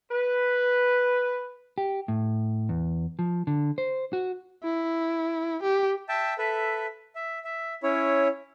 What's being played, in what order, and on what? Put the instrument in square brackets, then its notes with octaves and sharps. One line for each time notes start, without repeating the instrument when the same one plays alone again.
[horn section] B4
[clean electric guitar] G4
A2
E2
F3
D3
C5
F#4
[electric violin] E4
G4
[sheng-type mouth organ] E5 G5 A5
A4 B4 E5
E5
E5
C#4 E4 C#5